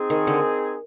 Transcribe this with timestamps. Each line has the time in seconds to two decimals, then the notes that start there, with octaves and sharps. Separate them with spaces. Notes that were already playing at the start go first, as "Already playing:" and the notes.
Already playing: C4 D#4 G#4
0.10 D#3
0.27 D3